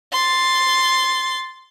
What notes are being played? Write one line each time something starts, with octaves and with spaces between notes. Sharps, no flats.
C6 A6